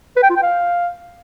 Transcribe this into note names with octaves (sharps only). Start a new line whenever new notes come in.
B4
G5
F4
G5
F5